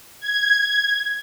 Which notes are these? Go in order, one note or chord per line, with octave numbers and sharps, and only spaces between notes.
G#6